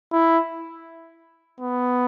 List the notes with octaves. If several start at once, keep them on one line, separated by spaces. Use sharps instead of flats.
E4
B3